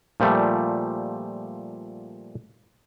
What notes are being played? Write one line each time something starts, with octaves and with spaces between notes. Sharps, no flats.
A#2 F3 G3 A3